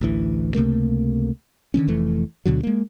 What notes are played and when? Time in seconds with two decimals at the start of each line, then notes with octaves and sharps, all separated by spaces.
0.01 A1 D2 E3
0.55 C#2 C3 A3 A#3
1.74 D3 D#3 A3 C#4
1.87 F1 F2 E3 A3
2.46 D2 B2 D3 F#3
2.63 G#3 A#3